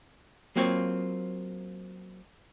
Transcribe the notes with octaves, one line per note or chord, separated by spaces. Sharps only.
F#3 A#3 C4 F4 C#5